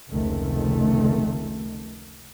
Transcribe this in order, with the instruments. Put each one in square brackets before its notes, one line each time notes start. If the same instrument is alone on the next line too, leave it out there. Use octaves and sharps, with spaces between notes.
[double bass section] F1 C#2 C3 D#3 A3